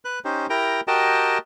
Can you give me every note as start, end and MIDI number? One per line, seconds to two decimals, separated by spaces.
0.05 0.19 71
0.05 0.19 90
0.25 0.47 61
0.25 0.47 63
0.25 0.47 67
0.25 0.47 72
0.50 0.81 64
0.50 0.81 67
0.50 0.81 70
0.50 0.81 79
0.50 0.81 82
0.88 1.38 66
0.88 1.38 67
0.88 1.38 70
0.88 1.38 75
0.88 1.38 79
0.88 1.38 81